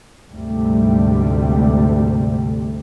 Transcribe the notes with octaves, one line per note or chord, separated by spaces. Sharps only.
D2 G#2 C3 G3 A3